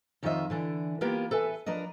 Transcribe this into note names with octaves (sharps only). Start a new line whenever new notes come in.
F2 D#3 F4 C5 D#5 E5
D3 E3 D4
A#3 B3 F4 G4 A#4 B4
A4 B4 E5 G#5
F3 D4 A#4 B4 D#5